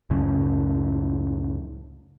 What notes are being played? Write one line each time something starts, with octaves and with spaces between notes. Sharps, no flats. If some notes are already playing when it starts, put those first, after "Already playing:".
C#2 F#2 A2 C#3